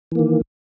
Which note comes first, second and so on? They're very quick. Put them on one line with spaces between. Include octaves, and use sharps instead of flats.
E3 A#3 D#3